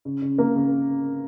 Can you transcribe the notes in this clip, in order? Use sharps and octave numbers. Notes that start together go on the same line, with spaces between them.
C#3
C#3
A#3
C#3